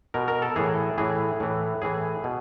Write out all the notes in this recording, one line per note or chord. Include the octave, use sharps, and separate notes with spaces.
B2 A#4
A#4
A4
A2 E3 G#4
A2 E3 G#4
A2 E3
A2 E3 G#4
B2